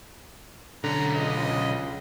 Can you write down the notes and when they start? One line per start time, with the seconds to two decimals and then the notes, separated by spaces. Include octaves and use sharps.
0.84 B1 D3 C#4 A#5
1.15 C#2 D#5